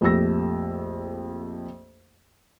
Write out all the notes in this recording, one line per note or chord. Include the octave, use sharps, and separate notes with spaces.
A#1 F2 A3 G4 E6 A#6